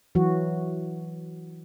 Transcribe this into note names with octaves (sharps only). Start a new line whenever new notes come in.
E3 F#3 F#4